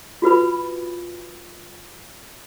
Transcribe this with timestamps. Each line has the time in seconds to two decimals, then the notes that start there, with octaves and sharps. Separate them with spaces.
0.22 F4 F#4 B4 B5